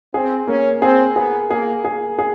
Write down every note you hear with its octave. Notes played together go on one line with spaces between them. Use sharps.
C4 G#4
A#3 C#4
C4 G#4
B3 G#4
A#3 G#4
G#4
G#4